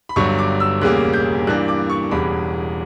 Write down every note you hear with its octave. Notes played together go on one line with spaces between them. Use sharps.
B5
G1 G2 F#3 C#6
D6
E6
E1 D2 C#3 G3 A#3 F#6
G6
G2 E3 A#3 D4 F#6
D6
C#6
E1 E2 C#3 G3 B5